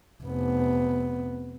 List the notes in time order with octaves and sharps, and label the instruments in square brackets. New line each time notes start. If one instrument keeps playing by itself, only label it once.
[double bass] F1 B3